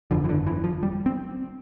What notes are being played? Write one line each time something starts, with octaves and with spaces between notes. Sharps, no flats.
G1 F2 D3 F3
E3
D3
E3
F3
G3
C4